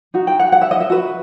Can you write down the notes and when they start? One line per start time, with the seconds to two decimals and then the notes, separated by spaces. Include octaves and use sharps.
0.14 D#4 F#4
0.27 G5
0.39 F#5
0.52 F#5
0.62 E5
0.71 D#5
0.80 E5
0.90 F#4 B4